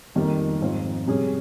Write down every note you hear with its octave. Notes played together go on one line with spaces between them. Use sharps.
F2 D#3 G3 A#3
G#2 F3 C4 F4
C3 G3 C#4 G#4